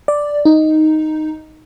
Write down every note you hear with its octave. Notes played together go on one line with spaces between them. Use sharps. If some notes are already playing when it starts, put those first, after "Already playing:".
D5
D#4